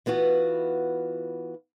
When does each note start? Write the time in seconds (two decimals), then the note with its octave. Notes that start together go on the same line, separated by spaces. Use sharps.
0.06 E3 B3 F4 F#4